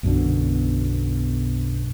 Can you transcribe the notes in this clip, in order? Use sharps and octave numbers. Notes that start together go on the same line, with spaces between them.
B1 F#2 B2 D3